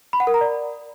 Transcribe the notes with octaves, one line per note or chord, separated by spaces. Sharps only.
B5
F#5
A#4
A#5
D5